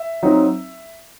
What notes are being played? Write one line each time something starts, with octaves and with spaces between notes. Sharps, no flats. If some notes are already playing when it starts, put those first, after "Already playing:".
Already playing: E5
F#3 C4 D#4